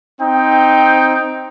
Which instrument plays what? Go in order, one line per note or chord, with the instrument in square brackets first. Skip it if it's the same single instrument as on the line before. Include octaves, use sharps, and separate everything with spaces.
[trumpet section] C4 D#4 G5